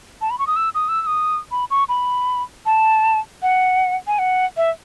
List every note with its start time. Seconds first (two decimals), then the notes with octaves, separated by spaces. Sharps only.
0.21 A5
0.30 B5
0.39 C#6
0.47 D#6
0.56 E6
0.74 D#6
0.88 E6
1.02 E6
1.06 D#6
1.51 B5
1.70 C#6
1.89 B5
2.66 A5
3.42 F#5
4.07 G#5
4.19 F#5
4.57 E5